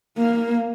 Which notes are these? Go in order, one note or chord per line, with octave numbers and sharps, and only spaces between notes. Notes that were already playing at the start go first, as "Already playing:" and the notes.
A#3